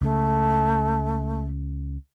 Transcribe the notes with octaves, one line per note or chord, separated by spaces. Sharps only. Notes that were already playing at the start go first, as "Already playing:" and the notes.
C#2 C#3 A3